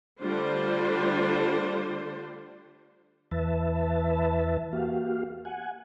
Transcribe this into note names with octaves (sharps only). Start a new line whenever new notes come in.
D3 G3 A3 D4 F4 C5
E2 E3 B4 E5 A5
A#3 F#4 G4 F5
F#5 G#5